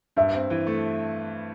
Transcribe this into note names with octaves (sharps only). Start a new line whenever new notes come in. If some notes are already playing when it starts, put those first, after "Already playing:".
G2 E5
C4
E3
A3